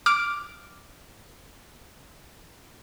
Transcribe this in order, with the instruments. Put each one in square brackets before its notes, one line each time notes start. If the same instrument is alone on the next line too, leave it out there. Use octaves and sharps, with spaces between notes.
[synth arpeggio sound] D6 F6